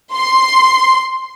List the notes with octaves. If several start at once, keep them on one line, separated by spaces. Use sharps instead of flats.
C6